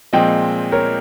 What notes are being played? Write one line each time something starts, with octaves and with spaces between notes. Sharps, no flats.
A#2 F3 G#3 C4 D#5 G5
A#4 C#5